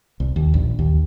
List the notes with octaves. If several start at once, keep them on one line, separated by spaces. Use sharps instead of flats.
C2
D#2
A#1
D#2